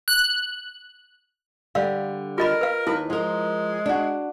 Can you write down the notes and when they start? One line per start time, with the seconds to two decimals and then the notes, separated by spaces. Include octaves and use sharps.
0.08 F#6
1.75 D3 G3 F5
2.38 F4 A#4 D#5 B5
2.61 B4 F5
2.87 D#2 E4 B4
3.10 F3 G#3 A#4
3.86 D4 F#4